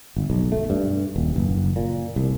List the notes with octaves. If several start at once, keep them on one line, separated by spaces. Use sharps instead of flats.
G1
B1
A3
G2
D#1
F#1
A#2
C2